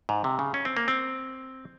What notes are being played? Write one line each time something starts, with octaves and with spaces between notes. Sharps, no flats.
G#2
C3
C#3
C#4
C4
A#3
C4